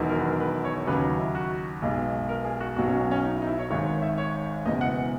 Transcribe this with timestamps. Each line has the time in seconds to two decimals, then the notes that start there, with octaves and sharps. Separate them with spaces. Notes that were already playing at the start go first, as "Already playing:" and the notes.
Already playing: E1 E2 D#3 F#3
0.09 A#4
0.20 B4
0.25 A#4
0.40 B4
0.64 C#5
0.87 D#2 C#3 F#3 B4
1.04 D#4
1.19 E4
1.35 F#4
1.82 B1 B2 G#3 G#4
2.29 A#4
2.45 G#4
2.60 F#4
2.76 B1 B2 F#3 F#4
2.88 C#4
3.00 C#4
3.11 C#4
3.23 D#4
3.35 E4
3.42 D#4
3.47 E4
3.59 C#5
3.71 G#1 G#2 D#3 G#3 C#5
3.87 C#5
4.02 E5
4.18 C#5
4.65 F#1 E2 B2 G#3 D#5
4.81 F#5